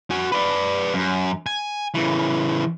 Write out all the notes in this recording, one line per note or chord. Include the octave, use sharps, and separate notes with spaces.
F#4 G#5
B4 D5
F#2
G#5
C#3 E3